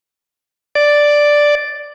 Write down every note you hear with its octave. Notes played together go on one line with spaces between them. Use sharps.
D5